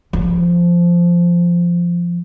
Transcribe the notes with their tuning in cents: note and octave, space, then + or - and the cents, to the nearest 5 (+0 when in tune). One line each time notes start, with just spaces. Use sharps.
F3 -10